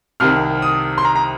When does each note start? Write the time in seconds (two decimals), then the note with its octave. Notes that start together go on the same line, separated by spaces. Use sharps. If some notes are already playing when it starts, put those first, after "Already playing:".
0.20 C2 C3 D#3 F6
0.62 D#6
0.98 C6
1.05 A#5
1.15 A#5